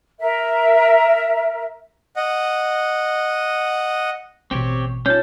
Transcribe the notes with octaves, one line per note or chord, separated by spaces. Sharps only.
A#4 E5
D#5 F#5
A1 B2 C4 G4 C#5
C#4 D#4 F4 C#5 A5